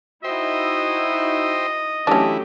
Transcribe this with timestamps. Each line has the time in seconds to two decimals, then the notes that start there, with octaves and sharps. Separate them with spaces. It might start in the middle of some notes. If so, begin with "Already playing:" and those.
0.24 D#4 E4 F#4 C5 D#5 E5 G5
2.07 E3 F#3 A3 C#4 D4 E4 G4